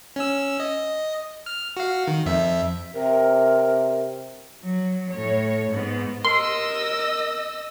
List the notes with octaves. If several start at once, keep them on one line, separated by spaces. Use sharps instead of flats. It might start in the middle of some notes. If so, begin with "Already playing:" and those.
C#4 E6
D#5
F6
F#4 F5
D#3
F2 E5
C3 A#4
F#3
A2 C#5
G#2 B3
A#4 D#5 C6 E6